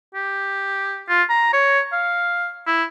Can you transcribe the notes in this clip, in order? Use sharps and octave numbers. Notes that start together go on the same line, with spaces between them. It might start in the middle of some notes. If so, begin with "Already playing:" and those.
G4
F4
A#5
C#5
F5
E4